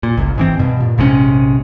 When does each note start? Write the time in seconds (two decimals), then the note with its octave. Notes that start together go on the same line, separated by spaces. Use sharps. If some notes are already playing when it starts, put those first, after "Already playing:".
0.03 A#2
0.17 G1 C#2
0.38 G#2 E3 C4
0.59 G2 B2
0.80 A#2
0.98 A#1 G#2 C3 C#4